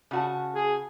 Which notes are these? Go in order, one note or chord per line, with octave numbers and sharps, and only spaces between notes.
C#3 F#4 A5
G#4